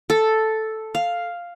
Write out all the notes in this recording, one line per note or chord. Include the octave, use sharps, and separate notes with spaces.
A4
F5